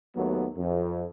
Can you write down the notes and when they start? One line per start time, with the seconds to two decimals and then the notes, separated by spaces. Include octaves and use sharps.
0.16 D#2 F#3 A3 B3
0.57 F2